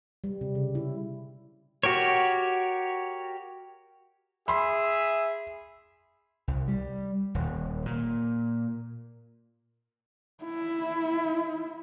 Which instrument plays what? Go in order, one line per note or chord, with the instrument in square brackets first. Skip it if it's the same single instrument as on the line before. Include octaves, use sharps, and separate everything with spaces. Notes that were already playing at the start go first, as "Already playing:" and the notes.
[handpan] G3
C3
C#3
E4
[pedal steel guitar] F#4 G4 A#4 C#5
[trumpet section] G#4 E5 [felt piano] B5 C6
[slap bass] C2
G3
D#1
A#2
[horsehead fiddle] E4